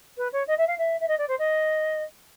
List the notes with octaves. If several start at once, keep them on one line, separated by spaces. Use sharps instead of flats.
B4
C#5
D#5
E5
F5
E5
E5
D#5
D5
C5
D#5